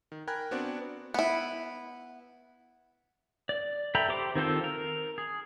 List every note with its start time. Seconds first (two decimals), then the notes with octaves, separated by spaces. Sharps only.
0.12 D#3
0.27 A#4 G5 G#5 B5 F#6 G#6
0.51 B3 C4 D4 F#4 C5 D5
1.14 B3 E4
3.49 D5
3.95 A4 E5 G5 A#5 B5
4.08 G4 C5 D6
4.35 D#3 C4 F4 A4 C5
4.64 A#4
5.18 G#4